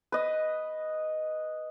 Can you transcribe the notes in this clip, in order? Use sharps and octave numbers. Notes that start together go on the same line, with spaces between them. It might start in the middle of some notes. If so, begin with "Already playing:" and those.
B4 D#5